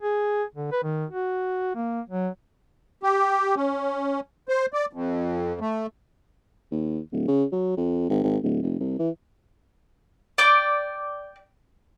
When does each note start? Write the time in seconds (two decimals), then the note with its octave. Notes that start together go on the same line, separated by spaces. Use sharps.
0.01 G#4
0.55 D3
0.72 B4
0.83 D#3
1.10 F#4
1.76 A#3
2.09 F#3
3.03 G4
3.56 C#4
4.49 C5
4.73 D5
4.93 F2
5.61 A3
6.71 D#2
7.12 D1
7.28 C#3
7.52 F#3
7.77 F2
8.10 G#1
8.23 G#1
8.43 D1
8.62 F1
8.80 C2
8.99 E3
10.38 D5 G5 D6